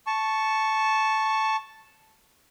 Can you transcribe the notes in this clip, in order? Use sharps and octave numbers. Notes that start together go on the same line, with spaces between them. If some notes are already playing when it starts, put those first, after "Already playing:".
A5 C#6